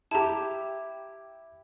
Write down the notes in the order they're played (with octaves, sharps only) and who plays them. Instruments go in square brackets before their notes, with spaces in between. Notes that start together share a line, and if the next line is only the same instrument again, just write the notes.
[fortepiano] E4 G4 [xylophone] A5 A#5